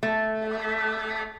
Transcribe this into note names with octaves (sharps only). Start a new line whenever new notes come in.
A3